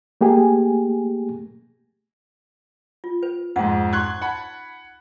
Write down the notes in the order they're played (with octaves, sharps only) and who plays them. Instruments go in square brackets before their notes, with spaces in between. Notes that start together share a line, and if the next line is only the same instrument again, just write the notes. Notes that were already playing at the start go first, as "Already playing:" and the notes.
[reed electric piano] A3 A#3 G4 G#4 G#5
[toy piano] F4
B4
[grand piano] F2 G#2 [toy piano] F#5
[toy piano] D#4 C#6 [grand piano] C6 F#6 G#6
[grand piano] F#5 A5 B5